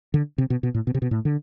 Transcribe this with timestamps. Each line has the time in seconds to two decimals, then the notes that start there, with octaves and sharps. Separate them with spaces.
0.14 D3
0.38 C3
0.50 B2
0.63 B2
0.75 A2
0.87 B2
0.95 C3
1.02 B2
1.11 A2
1.25 D3